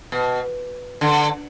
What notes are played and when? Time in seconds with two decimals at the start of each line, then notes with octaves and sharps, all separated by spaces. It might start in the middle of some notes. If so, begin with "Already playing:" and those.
0.12 B2
1.01 D3